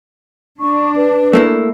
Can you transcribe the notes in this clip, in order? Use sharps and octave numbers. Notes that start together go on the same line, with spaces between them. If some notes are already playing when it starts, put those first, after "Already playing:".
D4 C#6
B4
A3 A#3 E4